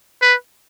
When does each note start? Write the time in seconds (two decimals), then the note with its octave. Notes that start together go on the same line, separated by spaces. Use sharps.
0.22 B4